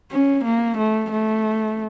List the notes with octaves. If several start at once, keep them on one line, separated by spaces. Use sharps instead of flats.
C#4
A#3
A3
A3